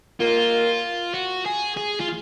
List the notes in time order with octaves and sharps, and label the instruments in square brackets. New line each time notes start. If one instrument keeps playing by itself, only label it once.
[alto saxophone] A#3 [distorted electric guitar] F4
[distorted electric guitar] F#4
G#4
G#4
F4